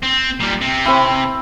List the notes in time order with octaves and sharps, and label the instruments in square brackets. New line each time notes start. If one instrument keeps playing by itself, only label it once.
[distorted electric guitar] C4
A#2 G3
C3
[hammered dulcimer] C4 E4